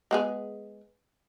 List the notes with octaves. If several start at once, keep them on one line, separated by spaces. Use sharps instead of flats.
G#3 B3 G#4